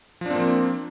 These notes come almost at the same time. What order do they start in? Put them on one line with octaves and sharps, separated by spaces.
F3 D4 C4 A#3